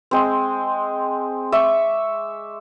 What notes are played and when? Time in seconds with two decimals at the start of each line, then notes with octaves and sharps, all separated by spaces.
0.11 G#3 C4
1.52 E5 C#6 D6